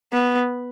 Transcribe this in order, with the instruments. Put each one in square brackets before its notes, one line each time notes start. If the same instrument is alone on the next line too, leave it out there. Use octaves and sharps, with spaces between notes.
[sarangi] B3